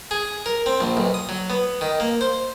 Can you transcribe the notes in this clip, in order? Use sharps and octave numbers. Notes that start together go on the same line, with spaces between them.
G#4
A#4
C4
A#1
B1
D#6
F#3
B3
D#3
A#3
C5